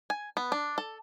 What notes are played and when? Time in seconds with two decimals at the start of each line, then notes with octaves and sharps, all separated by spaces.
0.10 G#5
0.37 B3
0.52 D4
0.78 A4